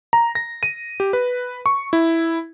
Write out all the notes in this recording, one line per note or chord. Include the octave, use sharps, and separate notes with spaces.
A#5
A#6
D#7
G4
B4
C#6
E4